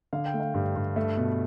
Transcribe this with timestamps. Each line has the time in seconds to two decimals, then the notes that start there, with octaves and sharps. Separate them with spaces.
0.13 D3 F5
0.25 G5
0.34 A3
0.40 F5
0.54 G2
0.76 G2
0.96 A3 E5
1.17 B2